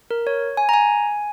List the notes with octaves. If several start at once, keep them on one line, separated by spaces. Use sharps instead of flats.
A#4
C#5
G#5
A#5
G#5